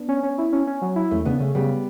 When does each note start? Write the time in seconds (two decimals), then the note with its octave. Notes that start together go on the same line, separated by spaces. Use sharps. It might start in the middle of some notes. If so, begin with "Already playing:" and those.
Already playing: B3 D4
0.09 C#4
0.23 C#4
0.38 E4
0.53 C#4
0.67 C#4
0.82 F#3
0.96 E4
1.11 E2 A3 C#4
1.25 C#3 B3 D4
1.40 C#3 A3 C#4
1.55 C#3 G3 B3